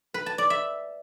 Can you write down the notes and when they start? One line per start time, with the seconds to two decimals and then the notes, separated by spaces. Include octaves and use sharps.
0.14 B4
0.26 A5
0.38 D5
0.50 E5